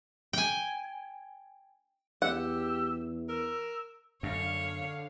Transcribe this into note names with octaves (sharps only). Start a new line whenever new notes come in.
G5 G#5
E2 G4 F#5 E6
A#4 E6
F#2 D3 C#5 F5